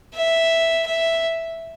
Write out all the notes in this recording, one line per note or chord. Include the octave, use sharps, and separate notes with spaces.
E5
E5